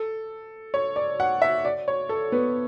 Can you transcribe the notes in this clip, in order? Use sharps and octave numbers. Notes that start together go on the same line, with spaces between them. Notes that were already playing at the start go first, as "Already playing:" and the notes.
Already playing: A4
C#5
D5
F#5
E5
D5
C#5
A4
B3